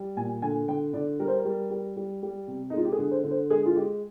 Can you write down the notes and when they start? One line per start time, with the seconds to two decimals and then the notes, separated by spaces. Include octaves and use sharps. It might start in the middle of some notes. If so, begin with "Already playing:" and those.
Already playing: G3
0.17 A#2 G#5
0.42 D3 G#5
0.68 D3 G5
0.94 D3 D5
1.19 G3 A#4
1.28 C5
1.37 A#4
1.45 G3
1.71 G3
1.97 G3
2.22 G3
2.48 C3
2.70 D#4
2.73 G#3 F4
2.85 G4
2.92 G#4
2.99 D3
3.11 C5
3.24 D3
3.31 C5
3.50 G#3 G#4
3.66 F4
3.76 G#3 G4